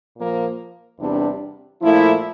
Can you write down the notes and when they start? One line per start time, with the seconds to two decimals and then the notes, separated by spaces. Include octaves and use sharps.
0.16 A#2 F3 A#3
0.99 E2 C3 G3 D4
1.82 A#2 F3 A3 E4